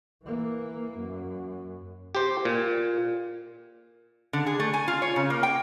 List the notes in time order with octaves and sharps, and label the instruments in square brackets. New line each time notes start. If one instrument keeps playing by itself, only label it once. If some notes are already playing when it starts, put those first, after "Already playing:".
[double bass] E3 A#3
F#2
[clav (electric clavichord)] G4 C5
A#2
[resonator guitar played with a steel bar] D3
G#4
A3
G#5
F4
C#5
C#3
A#3
G5